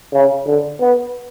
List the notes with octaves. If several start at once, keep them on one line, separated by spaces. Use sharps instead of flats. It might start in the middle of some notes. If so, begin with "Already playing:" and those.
C#3
D3
B3